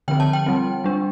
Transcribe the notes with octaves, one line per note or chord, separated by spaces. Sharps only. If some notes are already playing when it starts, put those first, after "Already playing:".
D3 F3 C4 G5
A5
G5
G3 C4
G3 D4